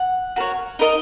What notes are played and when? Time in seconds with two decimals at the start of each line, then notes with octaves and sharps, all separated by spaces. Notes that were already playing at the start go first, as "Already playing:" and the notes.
Already playing: F#5
0.36 F#4 A#4 C#5
0.79 D#4 A#4 D#5